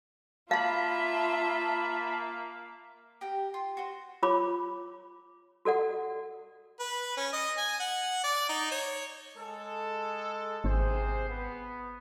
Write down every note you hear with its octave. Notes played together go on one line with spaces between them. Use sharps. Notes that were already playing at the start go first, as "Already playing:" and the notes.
A#3 F4 E5 F5 A5 B5
G4 A#4 G5
F4
F#4 C5
F4 C#5 B5 D6
F#4 A4 D5 F#5
B4
C#4
D#5
G#5
F#5
D5
D#4
C#5
G#3 G#4 A4
G#1 C3 G#4 C5
B3